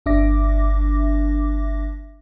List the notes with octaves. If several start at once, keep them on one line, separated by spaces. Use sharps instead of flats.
G1 D4 E5 D6 A#6